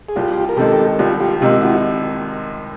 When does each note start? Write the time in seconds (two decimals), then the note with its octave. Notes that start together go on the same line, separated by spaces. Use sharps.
0.09 G#4
0.16 C2 F4 G4
0.49 A#4
0.57 C3 D#3 G#3 G4 A4
0.99 C2 F4 G4
1.20 F4 G4
1.41 C3 D#3 G#3 F4 G4
1.62 E4 F#4